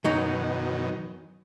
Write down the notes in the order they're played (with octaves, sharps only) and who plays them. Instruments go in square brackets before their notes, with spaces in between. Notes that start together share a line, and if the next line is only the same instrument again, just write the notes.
[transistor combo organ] F#2 B2 D#3 [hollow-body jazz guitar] E3 F#3 D#4